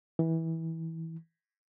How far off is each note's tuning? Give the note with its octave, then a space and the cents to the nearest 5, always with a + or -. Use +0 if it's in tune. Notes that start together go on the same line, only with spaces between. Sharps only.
E3 -20